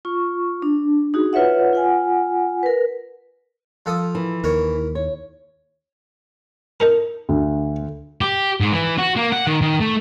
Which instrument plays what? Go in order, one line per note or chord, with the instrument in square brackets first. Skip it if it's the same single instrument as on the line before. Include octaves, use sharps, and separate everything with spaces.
[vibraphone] F4 C#6
D4
D#4 F#4 G#4
F4 B4 C#5 E5 F#5
F4 F#5 G#5
A#4 B4
[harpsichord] F3 A4 D#6
[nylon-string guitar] E3
[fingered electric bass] D#2 [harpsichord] A#4 C#5
[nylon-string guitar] C#5
[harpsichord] D#4 A4 A#4
[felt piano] D2
[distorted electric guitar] G4
G#2
E3
F#4
A#3
F#5
D#3
D#3
A3